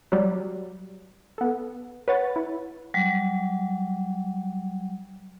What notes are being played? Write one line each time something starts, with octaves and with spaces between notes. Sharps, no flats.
F#3 G3
B3 A4
B4 C#5 F#5 A6
E4
F#3 G3